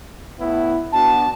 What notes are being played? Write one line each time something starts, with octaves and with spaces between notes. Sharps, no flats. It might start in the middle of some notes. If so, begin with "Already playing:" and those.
A2 B3 E4
B3 D4 F#4 A5